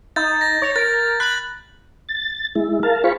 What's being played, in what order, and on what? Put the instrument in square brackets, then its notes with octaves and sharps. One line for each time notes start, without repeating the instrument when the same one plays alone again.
[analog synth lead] D#4 [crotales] G6 A6
[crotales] A#6
[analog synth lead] C#5
[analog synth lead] A#4 [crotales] A6
[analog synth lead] B5 [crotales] F#6 F#7
[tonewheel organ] A6
G#3 E4
A#4 F5 A5
F4 G#4 C5 F5 B5 C#6